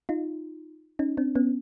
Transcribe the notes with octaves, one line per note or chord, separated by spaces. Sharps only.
D#4 F4
C#4 D#4
C4 D4
B3 C#4